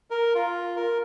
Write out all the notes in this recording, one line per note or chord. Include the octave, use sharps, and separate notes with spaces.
A#4
F4
A#4